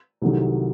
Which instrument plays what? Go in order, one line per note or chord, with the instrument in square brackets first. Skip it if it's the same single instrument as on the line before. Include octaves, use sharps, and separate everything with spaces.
[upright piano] C2 C3 D#3 F#3 A3